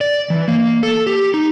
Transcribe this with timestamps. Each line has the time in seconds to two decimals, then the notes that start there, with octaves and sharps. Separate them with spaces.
0.01 D5
0.30 E3
0.48 A#3
0.83 A4
1.07 G4
1.34 D#4